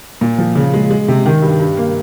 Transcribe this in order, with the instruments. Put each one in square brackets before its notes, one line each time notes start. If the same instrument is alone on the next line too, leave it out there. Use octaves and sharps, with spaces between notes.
[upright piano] A#2
F3
C#3
G#3
G#3
C3
D#3
G2
G2
A#3